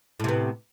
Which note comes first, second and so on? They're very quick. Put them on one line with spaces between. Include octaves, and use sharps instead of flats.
A2 C3 B3